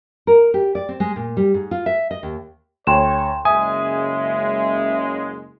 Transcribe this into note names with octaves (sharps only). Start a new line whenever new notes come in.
A#4
G4
D5
C4
G#3
A#2
G3
G#2
F4
E5
D#5
D#2
D2 C#5 G5 C6 E7
F#1 C#3 G#3 E5 G#5 D#6